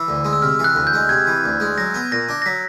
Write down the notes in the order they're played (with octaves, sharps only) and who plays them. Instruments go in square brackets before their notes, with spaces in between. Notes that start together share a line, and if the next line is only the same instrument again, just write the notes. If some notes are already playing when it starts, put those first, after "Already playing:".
Already playing: [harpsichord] E3 [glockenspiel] E6
[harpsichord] D2
G#3
[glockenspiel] E6
[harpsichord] C3 [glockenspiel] F6
[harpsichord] E3
[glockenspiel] F#6
[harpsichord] D2
[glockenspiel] G6
[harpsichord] G#3
[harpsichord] C3 [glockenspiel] G#6
[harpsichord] E3
D2
G#3
[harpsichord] F#3 [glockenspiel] A#6
[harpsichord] B3
[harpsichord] A#2 [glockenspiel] A#6
[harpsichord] D4
[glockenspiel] A#6
[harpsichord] F#3 [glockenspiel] B6